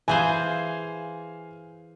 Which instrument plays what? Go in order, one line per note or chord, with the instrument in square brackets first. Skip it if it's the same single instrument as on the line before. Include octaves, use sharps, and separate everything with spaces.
[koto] E3 G#4 C5 [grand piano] F5 G#5